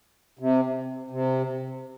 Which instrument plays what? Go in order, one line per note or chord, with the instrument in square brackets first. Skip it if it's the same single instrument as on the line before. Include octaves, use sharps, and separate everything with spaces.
[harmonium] C3
C3